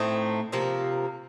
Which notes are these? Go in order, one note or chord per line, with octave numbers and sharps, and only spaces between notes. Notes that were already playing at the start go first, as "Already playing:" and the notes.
Already playing: A2 A3 C4 D#4
C3 F3 A#3